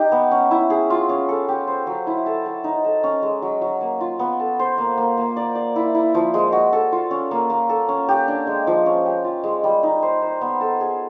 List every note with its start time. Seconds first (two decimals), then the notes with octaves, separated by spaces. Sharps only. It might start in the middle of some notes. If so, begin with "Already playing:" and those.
Already playing: D#4 G4
0.12 B3
0.31 C#4
0.51 E4
0.70 G#4
0.90 F4
1.09 C#4
1.29 A4
1.48 G4
1.67 C5
1.87 F#3
2.07 E4
2.26 A4
2.46 A4
2.64 D#4
2.85 A4
3.04 C#4
3.23 G#3
3.42 F#3
3.62 F#3
3.81 A#3
4.01 F4
4.19 B3
4.40 A4
4.59 C5
4.78 A#3
4.98 A#3
5.18 A#3
5.36 D5
5.55 D5
5.76 E4
5.95 E4
6.14 F3
6.34 G#3
6.52 F#4
6.73 A4
6.92 F4
7.11 C#4
7.31 A#3
7.50 A#3
7.69 A4
7.89 C#4
8.09 G4
8.28 D4
8.47 G#3
8.67 F3
8.86 C#4
9.05 G4
9.24 F4
9.44 G#3
9.64 G3
9.83 D#4
10.02 C5
10.22 C5
10.41 B3
10.61 A4
10.80 G#4